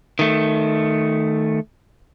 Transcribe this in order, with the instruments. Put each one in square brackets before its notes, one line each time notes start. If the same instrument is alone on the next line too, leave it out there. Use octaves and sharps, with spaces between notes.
[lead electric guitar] D#3 A3